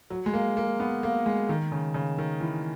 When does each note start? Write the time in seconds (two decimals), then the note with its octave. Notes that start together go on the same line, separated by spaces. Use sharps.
0.10 F#3
0.26 G#3
0.33 A#3
0.57 A#3
0.80 B3
1.03 A#3
1.26 G#3
1.49 D#3
1.72 C#3
1.94 C#3
2.18 D#3
2.41 E3